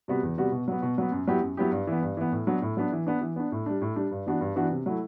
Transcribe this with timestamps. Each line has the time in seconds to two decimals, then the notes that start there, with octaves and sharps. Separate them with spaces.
0.08 C3 G3 B3 F#4
0.23 E2
0.37 C3 G3 B3 F#4
0.52 B2
0.68 F#3 B3
0.83 B2
0.98 F#3 B3
1.12 F#2
1.27 F#3 B3 E4 G4
1.42 F#2
1.57 F#3 B3 E4 G4
1.72 G2
1.87 E3 B3
2.02 G2
2.17 E3 B3
2.32 A2
2.47 F#3 B3 D4
2.62 A2
2.77 F#3 B3 D4
2.92 E3
3.06 B3 D4
3.21 E3
3.36 B3 D4
3.52 A2
3.66 G3 D4
3.82 A2
3.96 G3 D4
4.11 G2
4.26 E3 B3 D4 F#4
4.41 G2
4.56 E3 B3 D4 F#4
4.71 C3
4.86 F#3 A3 E4